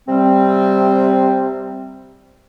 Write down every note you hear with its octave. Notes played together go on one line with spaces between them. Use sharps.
C3 G3 C4